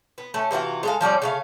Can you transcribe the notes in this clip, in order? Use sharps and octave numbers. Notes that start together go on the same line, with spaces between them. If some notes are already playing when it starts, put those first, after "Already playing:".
B3
A3 C#4
C3 E3 F4 F#4
G#3 A4 F5
F3 G3 C#4 D5
C#3 A3 F5